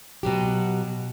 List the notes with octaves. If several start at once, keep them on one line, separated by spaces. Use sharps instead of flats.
B2 F#3 G4